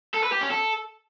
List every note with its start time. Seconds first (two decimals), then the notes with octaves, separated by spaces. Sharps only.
0.14 A4
0.23 B4
0.32 G4
0.42 C#4
0.51 A4